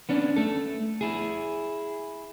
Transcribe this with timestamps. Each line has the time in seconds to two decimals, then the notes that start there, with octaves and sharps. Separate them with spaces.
0.09 B3 C#4 D4
0.36 A3 A4
1.01 E4 G#4